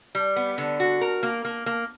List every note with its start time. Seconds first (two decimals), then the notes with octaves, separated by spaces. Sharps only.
0.15 G3
0.36 B3
0.58 D3
0.80 F#4
1.01 A#4
1.23 A#3
1.45 A#3
1.66 A#3